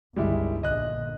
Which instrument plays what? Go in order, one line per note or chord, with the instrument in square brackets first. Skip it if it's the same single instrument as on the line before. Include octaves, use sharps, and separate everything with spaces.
[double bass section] G1 C#2 D#3 [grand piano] G3 G#3 E4
[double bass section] A#1 A#2 D3 [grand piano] D#5 F#6